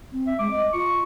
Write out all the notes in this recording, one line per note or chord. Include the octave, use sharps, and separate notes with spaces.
C4
E5
G#3 D6
D#5
F4 C#6